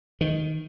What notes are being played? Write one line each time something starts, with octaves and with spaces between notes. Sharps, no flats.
D#3